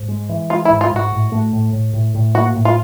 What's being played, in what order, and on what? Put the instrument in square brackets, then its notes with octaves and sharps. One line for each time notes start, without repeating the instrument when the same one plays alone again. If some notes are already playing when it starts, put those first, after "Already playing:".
Already playing: [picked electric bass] G#2
G#3
E3
[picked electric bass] G#3 [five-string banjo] F4
[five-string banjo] E4
[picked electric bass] G#2
[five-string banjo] F4
[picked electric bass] G#2 [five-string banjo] F#4
[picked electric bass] A2
A3
A2
A2
A2
A2
[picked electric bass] A#3 [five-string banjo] F#4
[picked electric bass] A2
[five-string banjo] F4